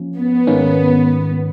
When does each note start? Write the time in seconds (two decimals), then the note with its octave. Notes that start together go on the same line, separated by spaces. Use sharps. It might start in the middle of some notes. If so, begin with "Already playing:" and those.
Already playing: F3 A#3 C#4
0.16 B3
0.47 G#2 D#3 A#3 C#4